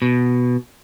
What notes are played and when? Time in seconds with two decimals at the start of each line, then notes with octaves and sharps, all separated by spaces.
0.02 B2